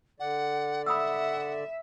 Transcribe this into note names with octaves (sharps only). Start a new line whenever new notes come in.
D3 D5 F#5
E5 F#5 B5 D#6 E6